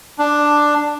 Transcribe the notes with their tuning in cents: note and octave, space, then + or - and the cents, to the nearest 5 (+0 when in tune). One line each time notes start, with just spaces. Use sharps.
D4 +5